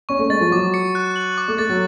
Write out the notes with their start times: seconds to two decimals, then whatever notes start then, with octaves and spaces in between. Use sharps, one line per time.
0.09 C#4 C#6
0.19 A3
0.30 G#3 A6
0.41 F3
0.51 F#3 D6
0.74 C#7
0.95 F#6
1.16 F#7
1.38 D6
1.48 A3
1.58 A3 A6
1.70 F#3